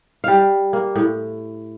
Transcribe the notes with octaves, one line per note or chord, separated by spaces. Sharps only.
G3 F5
A#3
A2